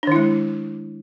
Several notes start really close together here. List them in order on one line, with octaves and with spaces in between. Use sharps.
D4 D#3 E4 G#3